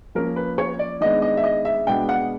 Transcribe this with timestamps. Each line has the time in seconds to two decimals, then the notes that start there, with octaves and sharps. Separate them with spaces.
0.15 F3 A#3 C#4 A#4
0.36 B4
0.58 C#5
0.79 D5
1.01 D#3 G#3 B3 D4 D#5
1.22 D#5
1.37 E5
1.44 D#5
1.65 E5
1.87 B2 G#3 B3 D4 G5
2.09 F#5